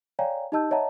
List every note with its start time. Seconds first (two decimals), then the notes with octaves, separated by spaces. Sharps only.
0.19 C#5 D5 F5 G5 G#5 A#5
0.52 D#4 G4 D#5 A5 E6 G6
0.71 C#5 D#5 E5 F#5 A5 A#5